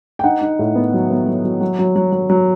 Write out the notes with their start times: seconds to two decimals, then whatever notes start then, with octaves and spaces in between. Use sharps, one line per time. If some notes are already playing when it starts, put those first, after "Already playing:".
0.19 G5
0.24 D#4 F#5
0.41 D#4
0.59 A2
0.75 B3
0.93 F#3
1.10 B3
1.27 F#3
1.44 F#3
1.61 F#3
1.79 F#3
1.96 F#3
2.12 F#3
2.30 F#3